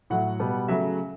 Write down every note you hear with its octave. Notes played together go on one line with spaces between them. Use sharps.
A2 F#3 A3 F#5
B2 G3 B3
C#3 F#3 A3 E5